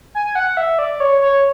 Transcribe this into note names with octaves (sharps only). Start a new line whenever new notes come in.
G#5
F#5
E5
D5
C#5
C#5